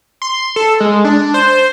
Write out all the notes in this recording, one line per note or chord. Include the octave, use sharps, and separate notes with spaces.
C6
A4
G#3
D4
C5